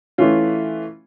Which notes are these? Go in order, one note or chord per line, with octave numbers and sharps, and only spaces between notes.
E3 A3 C#4 F4